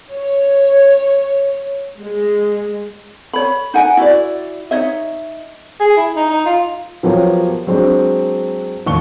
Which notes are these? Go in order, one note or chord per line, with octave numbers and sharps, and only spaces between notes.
C#5
G#3
C#5 B5
D#4 F#5 G#5
E4 F#4 D5
D#4 C#5 D#5 E5
G#4
E4
D#4
D#4
F4
F3 F#3 B3 G4 A#4 C#5
F#3 G#3 C4 D4
E1 D#2 C#6 G7